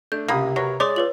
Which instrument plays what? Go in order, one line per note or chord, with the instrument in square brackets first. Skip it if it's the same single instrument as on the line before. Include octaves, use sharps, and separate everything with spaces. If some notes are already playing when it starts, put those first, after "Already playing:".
[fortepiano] A3 D4 [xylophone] G6
[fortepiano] C#2 B5 D#6 [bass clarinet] C3 [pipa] A#3
[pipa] F#3 [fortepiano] A#4 B4 C#5
[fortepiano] G#3 [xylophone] C#5 C6 D#6 [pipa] D5
[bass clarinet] F4 [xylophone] B4 C#5 F#7